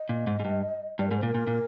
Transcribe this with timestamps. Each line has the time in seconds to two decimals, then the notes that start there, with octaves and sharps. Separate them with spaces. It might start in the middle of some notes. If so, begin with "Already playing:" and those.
Already playing: D#5
0.09 A#2
0.27 G#2
0.40 G#2
0.45 G2
0.99 G2 D5
1.08 A#4
1.11 G#2
1.17 C5
1.23 A#2
1.26 A#4
1.35 A#2
1.47 A#2